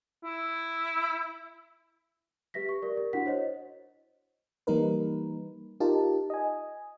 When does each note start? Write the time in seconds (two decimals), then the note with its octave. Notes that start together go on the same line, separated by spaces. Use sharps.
0.24 E4
2.54 G4 B4 E5 A#6 B6
2.69 C#6
2.82 G4 A#4 D5
2.97 A#4
3.13 D4 E4 F#4 F#5 B6
3.26 C5 C#5 D#5
4.67 E3 G3 A#3 D#4 A#4 B4
5.80 D#4 F4 G4 A#4 A5
6.30 D#5 G#5